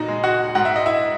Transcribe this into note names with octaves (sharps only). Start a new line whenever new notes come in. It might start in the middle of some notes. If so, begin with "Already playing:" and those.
Already playing: A#2 D#4 F#4 D#5
G#3
F#4 F#5
G#2 F#5
E5
D#5
E4 E5